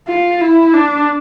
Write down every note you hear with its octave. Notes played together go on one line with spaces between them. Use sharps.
F4
E4
D4